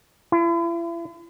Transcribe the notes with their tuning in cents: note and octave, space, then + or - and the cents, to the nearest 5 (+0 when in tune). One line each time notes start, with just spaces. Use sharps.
E4 +40